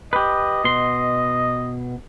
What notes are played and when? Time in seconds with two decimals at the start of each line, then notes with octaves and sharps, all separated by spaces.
0.13 G4 B4 D#5
0.64 B2 C6